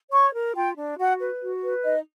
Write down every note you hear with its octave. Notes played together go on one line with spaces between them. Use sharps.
C#5 C#6
A#4
F4 G5
D4
F#4 F#5
B4
F#4
B4
D#4 D#5